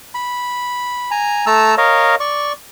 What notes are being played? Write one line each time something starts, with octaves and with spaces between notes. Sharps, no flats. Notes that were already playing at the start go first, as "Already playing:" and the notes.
B5
G#5 A#5
A3 A5 A#5 E6
A#4 C#5 D#5 F5
D5 C#6